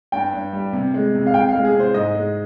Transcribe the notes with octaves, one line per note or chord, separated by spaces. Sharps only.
G2 G5
G2
G3
C3
G#3
C3
F5
C3 G5
F5
G#3
G#4
C3
C5
G#2 D#5
G#3